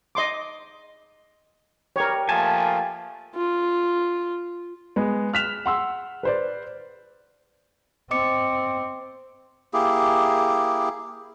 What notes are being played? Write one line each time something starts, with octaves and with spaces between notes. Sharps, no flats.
D#5 C6 D6
G3 G4 A#4 B4 C#5
F3 A3 A#3 G#5 A5
F4
G#3 B3
F6 F#6 B6 E7 F7
F#5 C6 E6
B4 C5 D5
C4 D#5 D6 C#7
A#3 E4 G4 G#4